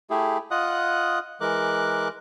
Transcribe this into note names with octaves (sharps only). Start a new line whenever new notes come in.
A3 E4 G4 G#4
F4 D#5 F#5 D#6 F#6
E3 G#3 A#4 D6 F#6